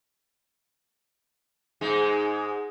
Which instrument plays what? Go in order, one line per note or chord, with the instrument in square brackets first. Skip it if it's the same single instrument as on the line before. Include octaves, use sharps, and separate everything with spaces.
[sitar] G#2 G#3 D#4